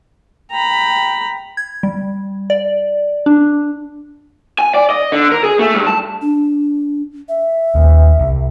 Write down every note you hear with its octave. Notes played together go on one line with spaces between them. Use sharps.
G5 A#5 B5
G#6
G3
D5
D4
G#5
D5
D#5
D3
A#4
G#4
A3
G2
A5
D4
E5
D#1 D#2
C2